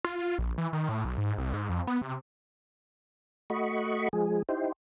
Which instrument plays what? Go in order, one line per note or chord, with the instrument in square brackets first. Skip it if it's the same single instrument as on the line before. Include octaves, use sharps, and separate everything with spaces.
[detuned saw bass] F4
A#1
E3
D#3
A2
B1
G#2
C2
G#2
F2
B3
C3
[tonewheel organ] A3 F#4 D#5 B5 C#6
F3 G#3 G#4
D#4 E4 G4 C5